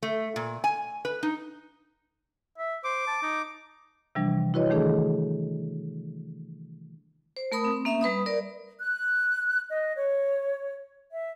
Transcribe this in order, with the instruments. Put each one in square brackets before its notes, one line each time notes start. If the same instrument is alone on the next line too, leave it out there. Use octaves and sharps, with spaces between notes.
[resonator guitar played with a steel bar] A3
A#2
G#5
B4
D#4
[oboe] E5
[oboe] C5 [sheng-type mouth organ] D6
[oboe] A5
D#4
[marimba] C3 E3 F3 G3 D4
E4 F#4 B4 C#5 D#5
D#3 E3 A3 D4 G#4 A4
[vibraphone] C5
A3 A#4 B5 D#6
C4
A#3 C#4 E5
G3 B4 B5 D#6
A#4 D5
[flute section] F#6
D#5
C#5
E5